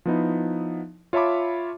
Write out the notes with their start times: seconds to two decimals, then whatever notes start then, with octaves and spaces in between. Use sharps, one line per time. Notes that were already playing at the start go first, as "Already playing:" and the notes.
0.06 F3 B3 D#4 E4
1.13 F4 C#5 E5 A5 B5 D6